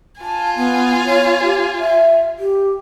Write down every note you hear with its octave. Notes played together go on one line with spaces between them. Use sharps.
F4 G#5 A5
B3
C#5
G4
E5
G4